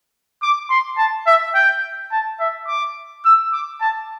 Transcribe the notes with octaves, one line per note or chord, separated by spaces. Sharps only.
D6
C6
A5
E5
G5
A5
E5
D6
E6
D6
A5